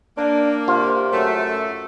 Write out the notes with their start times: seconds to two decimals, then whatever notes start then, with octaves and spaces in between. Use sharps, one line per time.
0.17 A#3 D4
0.68 C3 F4
1.12 F#2 A3